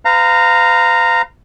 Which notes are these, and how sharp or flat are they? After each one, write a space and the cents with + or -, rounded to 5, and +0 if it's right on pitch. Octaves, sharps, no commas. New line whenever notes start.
B4 +40 F5 +0 A#5 -15